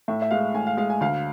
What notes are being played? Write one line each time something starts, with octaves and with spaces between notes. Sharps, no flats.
A2 E5
E5
G#3 F5
A2 G#5
F5
G#3 F5
G#5
D2 F5